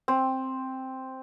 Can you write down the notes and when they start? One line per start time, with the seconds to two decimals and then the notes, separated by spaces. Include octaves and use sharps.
0.08 C4